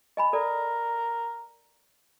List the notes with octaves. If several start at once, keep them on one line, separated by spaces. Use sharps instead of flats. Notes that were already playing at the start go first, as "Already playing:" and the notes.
D#5 G#5 B5
A4 A#4 D5